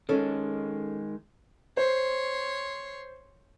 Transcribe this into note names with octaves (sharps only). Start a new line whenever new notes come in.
D#3 G#3 C#4 A4 C#5
C5 C#5 C6